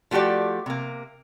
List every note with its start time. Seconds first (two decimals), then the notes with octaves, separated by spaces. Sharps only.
0.11 F3 A3 F#4 G4 D5
0.66 C3 A#3